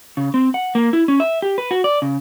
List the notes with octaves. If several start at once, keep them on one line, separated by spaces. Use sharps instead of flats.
C#3
C4
F#5
A#3
E4
C#4
E5
G4
B4
F#4
D5
C#3